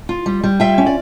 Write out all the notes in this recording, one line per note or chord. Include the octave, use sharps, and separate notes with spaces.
F4
G3
G3
F4 E5 G5
C#4
D5